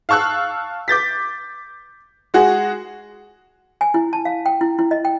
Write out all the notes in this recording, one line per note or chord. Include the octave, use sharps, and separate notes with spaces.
F5 A5 C#6 E6 F#6
D6 G6 A6 B6
G#3 F#4 G#4
G#5
E4
A5
F5
G5
E4
E4
D#5
G5